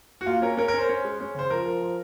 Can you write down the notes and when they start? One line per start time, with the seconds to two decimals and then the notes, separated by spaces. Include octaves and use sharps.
0.21 F#4
0.26 A#3 F4
0.42 C#4 A#4
0.57 C#4 A#4
0.68 A#4
0.74 C#4 C5
0.89 C#4
1.05 G#3
1.20 C#4
1.35 C#3 C5
1.50 F3 A#4
1.65 F3
1.81 F3